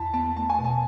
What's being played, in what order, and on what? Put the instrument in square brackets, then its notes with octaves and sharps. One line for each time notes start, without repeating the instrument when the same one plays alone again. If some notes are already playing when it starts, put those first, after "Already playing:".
Already playing: [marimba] E2 [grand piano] A5 B5
[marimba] B3 [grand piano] A5
[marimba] A3 [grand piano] A5
[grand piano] G#5
[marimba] B2
[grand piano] A5